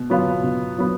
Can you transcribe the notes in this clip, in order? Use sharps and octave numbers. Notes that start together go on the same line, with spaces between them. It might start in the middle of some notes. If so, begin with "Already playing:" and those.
Already playing: B2
F#3 B3 F4
B2
F#3 B3 F4